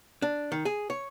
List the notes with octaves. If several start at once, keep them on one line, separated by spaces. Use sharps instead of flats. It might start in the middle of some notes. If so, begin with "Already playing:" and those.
D4
D#3
G#4
C#5